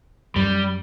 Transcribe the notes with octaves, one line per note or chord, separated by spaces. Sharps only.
F#2 G3